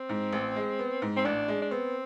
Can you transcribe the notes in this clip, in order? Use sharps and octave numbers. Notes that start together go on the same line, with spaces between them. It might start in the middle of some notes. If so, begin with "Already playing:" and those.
Already playing: C4
G#2
A1
G#3
B3
G#2
C4
A1 D4
G#3
D4
B3 C4